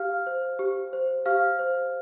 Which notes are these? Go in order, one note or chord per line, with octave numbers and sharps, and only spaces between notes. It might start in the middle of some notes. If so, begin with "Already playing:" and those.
Already playing: G4 F5 F6
C5
G4
C5
G4 F5 F6
C5